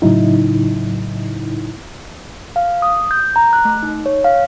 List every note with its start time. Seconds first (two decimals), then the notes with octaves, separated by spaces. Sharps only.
0.02 A2 C#3 F#3 D#4 E4
2.56 F5
2.82 D#6
3.11 G6
3.36 A#5
3.53 F#6
3.65 A3
3.83 D#4
4.06 C#5
4.24 F5